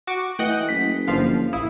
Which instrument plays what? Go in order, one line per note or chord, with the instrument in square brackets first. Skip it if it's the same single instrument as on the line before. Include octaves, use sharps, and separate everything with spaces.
[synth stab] F#4 C#6 D6
[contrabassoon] E3 [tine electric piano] A3 [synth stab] D#5 F#5 G5
[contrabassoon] F#1 [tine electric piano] B6
[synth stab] G1 F3 F5 [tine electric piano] A#3
[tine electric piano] A1 F5 D#6 [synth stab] E4